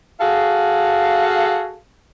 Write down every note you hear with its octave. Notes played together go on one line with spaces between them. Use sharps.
F#4 G#4 A4 F5